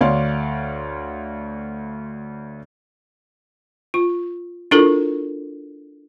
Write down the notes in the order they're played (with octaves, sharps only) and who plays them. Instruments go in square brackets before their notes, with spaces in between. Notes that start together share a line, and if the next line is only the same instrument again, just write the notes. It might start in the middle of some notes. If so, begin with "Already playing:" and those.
[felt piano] D2 C#5 D5 F5 C6
[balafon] F4
D4 E4 F4 A4 A#4